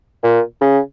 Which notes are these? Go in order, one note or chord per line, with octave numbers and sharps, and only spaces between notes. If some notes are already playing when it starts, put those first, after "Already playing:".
A#2
C#3